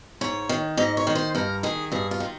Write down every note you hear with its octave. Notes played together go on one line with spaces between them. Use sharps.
G#2 C#5
D#3
G#2 D#5
C#5
D#3
C5
G2 A#4
D#3 G#4
G2 G#4
F4
D#3